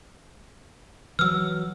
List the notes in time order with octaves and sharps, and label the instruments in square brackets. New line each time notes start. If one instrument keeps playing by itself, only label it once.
[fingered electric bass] E3 F#3 [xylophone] E6 F6